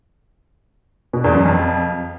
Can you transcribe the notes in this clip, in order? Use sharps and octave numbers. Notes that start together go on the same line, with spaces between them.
B2
E2
F#2
F2